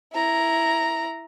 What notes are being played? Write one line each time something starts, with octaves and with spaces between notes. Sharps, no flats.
E4 A#5